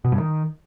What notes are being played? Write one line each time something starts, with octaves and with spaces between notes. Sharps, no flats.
B2
G2
D#3